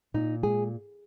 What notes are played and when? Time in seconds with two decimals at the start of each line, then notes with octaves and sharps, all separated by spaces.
0.14 A#2 D#4
0.43 G#3 G#4